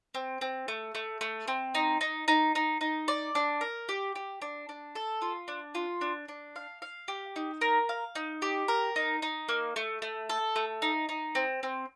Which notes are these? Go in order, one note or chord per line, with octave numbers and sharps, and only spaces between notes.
C4
C4
A3
A3
A3
C4
D#4
D#4
D#4
D#4
D#4
D5
D4
A#4
G4
G4
D4
D4
A4
F4
D4
F4
D4
D4
F5
F5
G4
D#4
A#4
F5
D#4
G4
A#4
D#4
D#4
A#3
A3
A3
A4
A3
D#4
D#4
C4
C4